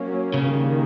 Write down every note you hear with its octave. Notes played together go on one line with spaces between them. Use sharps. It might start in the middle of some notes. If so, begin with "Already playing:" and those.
Already playing: F#3 A#3 C#4
C#3
D#3 G3 A#3